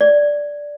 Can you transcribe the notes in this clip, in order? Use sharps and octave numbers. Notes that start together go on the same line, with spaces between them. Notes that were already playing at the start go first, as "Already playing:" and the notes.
D5